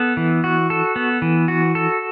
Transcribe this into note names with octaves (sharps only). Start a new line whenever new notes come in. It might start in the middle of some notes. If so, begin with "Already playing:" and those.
Already playing: B3 A4
E3
F#4
A4
B3
E3
F#4
A4